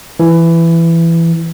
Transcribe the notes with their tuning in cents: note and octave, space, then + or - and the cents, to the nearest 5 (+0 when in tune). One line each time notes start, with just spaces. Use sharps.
E3 +15